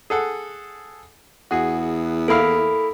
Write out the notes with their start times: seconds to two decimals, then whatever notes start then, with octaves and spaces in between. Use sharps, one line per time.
0.10 G#4 A4 F#5
1.51 E2 F#4 G#4
2.28 A#3 E4 A4 F5 B5